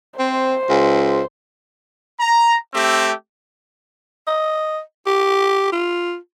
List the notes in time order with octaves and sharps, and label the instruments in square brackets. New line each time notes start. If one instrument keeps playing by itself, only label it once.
[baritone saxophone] C4 [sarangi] C5
[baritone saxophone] C#2
[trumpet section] A#5
A3 C4 G4
[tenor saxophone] D#5
G4
F4